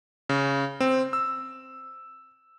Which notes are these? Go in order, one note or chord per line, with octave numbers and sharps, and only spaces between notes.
C#3
C4
E6